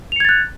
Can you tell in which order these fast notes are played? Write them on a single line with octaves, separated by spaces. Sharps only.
F7 C#7 G#6 A6 F#6